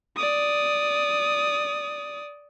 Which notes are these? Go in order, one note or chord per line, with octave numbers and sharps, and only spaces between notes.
D5 D#6